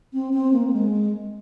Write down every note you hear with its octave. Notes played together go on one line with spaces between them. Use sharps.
C4
C4
A#3
A#3
G#3